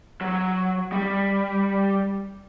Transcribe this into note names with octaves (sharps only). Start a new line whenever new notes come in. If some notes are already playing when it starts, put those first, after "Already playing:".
F#3
G3